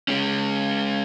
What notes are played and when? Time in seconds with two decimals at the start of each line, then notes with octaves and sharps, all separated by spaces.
0.08 G#3 C#4